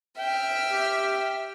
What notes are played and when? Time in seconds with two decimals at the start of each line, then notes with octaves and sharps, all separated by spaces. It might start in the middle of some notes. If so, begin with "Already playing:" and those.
0.18 E5 G5 F6
0.72 G4